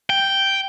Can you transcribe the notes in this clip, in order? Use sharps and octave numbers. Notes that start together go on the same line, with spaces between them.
G5